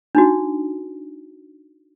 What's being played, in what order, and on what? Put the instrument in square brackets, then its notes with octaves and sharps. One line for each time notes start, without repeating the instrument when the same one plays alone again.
[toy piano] D4 D#4 F#4